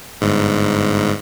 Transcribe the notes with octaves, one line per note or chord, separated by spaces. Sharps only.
G1 G#2